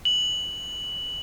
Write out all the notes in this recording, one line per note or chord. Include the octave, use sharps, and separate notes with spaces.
F#7